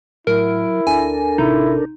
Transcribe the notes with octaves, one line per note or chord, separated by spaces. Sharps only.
A2 F#3 E4 A#4
D2 D4 A4 A#4 G#5
A1 C3 D#4 E4